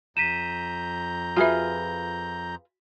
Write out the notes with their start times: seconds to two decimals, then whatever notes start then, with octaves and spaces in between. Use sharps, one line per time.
0.17 F2 A#5 G6 B6 D#7 E7
1.36 F4 F#4 G#4 B4 E5